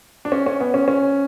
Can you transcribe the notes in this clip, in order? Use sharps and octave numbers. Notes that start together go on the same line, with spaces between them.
D4
C#4
C#4
B3
C#4
C#4